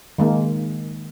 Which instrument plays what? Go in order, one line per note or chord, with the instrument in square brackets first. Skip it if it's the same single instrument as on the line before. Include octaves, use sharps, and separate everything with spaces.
[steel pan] D#3 G#3 A#3